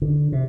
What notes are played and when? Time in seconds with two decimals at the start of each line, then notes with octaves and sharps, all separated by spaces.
0.02 D3
0.32 C3